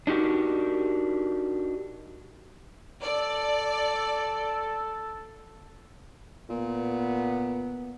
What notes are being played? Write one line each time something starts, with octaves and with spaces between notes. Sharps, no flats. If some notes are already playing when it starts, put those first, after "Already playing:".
D4 D#4 F#4 G4 A#4
A4 D5
A#2 B3